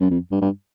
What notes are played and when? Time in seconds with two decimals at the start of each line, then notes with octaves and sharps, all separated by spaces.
0.01 F#2
0.11 F2
0.31 G2
0.42 G2